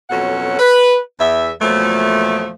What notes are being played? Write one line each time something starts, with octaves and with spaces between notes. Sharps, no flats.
F2 B2 F#3 C#4 A4 F#5
B4
E2 E5
E2 A#2 F3 F#3 A3